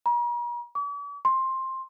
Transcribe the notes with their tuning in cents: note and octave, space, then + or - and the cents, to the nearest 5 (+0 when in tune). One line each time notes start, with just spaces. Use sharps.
A#5 +45
D6 -45
C6 +10